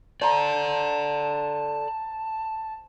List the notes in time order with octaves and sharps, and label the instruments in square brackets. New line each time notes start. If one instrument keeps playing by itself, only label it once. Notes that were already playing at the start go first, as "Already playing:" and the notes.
[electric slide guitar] A4 D5 [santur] C5 A#5 [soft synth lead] A5